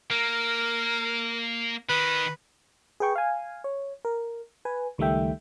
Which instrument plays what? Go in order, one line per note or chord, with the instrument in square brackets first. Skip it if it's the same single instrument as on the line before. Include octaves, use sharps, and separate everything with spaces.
[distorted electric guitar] A#3 [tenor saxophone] A#4
[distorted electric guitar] D#3 [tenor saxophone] B4
[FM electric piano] G#4 B4 G5 C#6
F5 G#5
C#5
A#4
B4 G#5
C#2 D#3 G3 A3 E5 G5